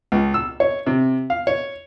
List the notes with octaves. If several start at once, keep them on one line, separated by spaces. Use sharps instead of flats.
C#2
E6
C#5
C3
F5
C#5